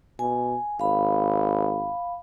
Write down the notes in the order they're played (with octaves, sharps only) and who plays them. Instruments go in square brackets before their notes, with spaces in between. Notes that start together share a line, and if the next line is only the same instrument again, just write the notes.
[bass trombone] B2 [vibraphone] G#5
[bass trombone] G#1 [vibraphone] F5 B5